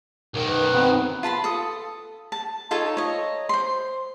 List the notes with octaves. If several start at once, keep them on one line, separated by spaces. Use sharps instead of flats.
B1 D#3 A#4
B4
B3 C4
F4 A5 B5 C6
A4 D#6
A5
D#4 F4 A4 C#5
C#5 D#5
C5 C6